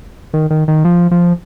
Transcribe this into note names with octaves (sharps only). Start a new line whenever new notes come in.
D#3
D#3
D#3
F3
F3